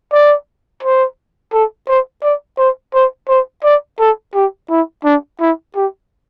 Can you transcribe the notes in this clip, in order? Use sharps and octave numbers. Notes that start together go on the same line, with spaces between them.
D5
C5
A4
C5
D5
C5
C5
C5
D5
A4
G4
E4
D4
E4
G4